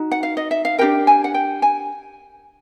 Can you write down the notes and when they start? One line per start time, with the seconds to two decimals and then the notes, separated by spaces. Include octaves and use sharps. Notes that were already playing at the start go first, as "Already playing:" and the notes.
Already playing: D#4 F#4
0.11 F#5
0.23 F5
0.37 D#5
0.51 E5
0.65 F5
0.78 D4 G4 A#4 G5
1.07 G#5
1.24 F#5
1.34 G5
1.62 G#5